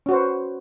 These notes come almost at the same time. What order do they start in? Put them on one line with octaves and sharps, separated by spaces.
C#4 F#4 C5 B4